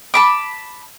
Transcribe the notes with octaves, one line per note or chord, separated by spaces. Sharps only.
A5 B5 D6